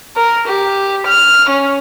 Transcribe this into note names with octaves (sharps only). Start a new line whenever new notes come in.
A#4
G4
F6
C#4